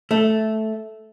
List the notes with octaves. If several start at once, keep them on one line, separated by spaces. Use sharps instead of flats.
A3